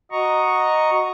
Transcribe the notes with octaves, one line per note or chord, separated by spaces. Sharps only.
F#4 D#5 A#5 C#6